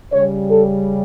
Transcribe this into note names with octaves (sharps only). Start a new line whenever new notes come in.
C#3 G3 C#5
A4